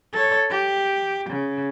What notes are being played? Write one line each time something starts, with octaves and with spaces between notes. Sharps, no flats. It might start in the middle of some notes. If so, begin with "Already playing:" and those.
A4 C#5
G4
C#3